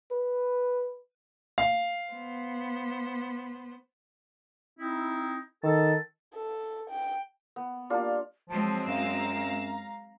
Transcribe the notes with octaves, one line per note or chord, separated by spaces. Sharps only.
B4
F5
B3 C5
C4 D#4 E4
D#3 A4 A5
A4
G5
B3
G3 A#3 D4 F4
F3 F#3 G#3 C4 A5
F#2 F5 A#5 E7